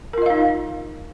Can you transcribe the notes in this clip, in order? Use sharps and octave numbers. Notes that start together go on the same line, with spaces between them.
D#4 F4 A#4 D#5 F5